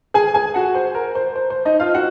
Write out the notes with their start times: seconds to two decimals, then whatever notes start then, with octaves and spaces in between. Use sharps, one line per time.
0.14 G#4 G#5
0.34 G#4 G#5
0.54 F#4 F#5
0.75 C5
0.95 A#4
1.15 C5
1.36 C5
1.50 C5
1.65 D#4 D#5
1.80 F4 F5
1.95 F#4 F#5